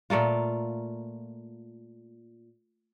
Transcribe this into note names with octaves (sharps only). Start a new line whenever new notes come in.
A#2 A3 A#3 F4